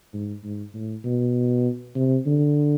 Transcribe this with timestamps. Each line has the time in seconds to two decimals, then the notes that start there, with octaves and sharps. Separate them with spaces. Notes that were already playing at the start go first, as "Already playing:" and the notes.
0.14 G#2
0.44 G#2
0.74 A2
1.05 B2
1.96 C3
2.27 D3